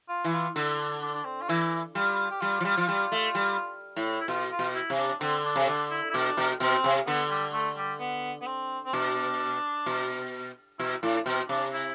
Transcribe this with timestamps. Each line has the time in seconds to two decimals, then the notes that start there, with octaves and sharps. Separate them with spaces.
0.09 F4
0.24 E3
0.33 F4
0.55 D3 E4
0.80 D4
1.02 D4
1.14 D4
1.25 C4
1.42 F4
1.49 E3 E4
1.95 G3 F4
2.31 G4
2.41 G3 F4
2.60 F3
2.65 G3
2.77 F3
2.88 G3
3.12 A3
3.35 G3
3.96 A2
4.20 E4
4.28 B2 F4
4.51 F4
4.59 B2
4.75 E4
4.90 C3
4.98 D4
5.21 D3 C4
5.45 D4
5.56 C3
5.67 D3 D4
5.90 E4
6.10 E4
6.14 B2 D4
6.37 B2
6.60 B2 C4
6.84 C3
7.07 D3 B3
7.30 G3
7.53 A3
7.77 G3
8.00 B3
8.41 B3
8.47 C4
8.86 C4
8.93 B2 D4
9.86 B2
10.79 B2 E4
11.03 A2 D4
11.25 B2 C4
11.49 C3 D4
11.73 E4